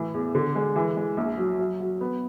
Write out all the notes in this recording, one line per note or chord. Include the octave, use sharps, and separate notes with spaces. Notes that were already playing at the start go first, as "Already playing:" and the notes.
Already playing: A2 E3
E2
D3
G#3
E3
G#3
A#1
F#3
F#3
F#3
B3